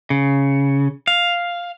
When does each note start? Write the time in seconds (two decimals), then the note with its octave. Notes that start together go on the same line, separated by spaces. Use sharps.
0.10 C#3
1.08 F5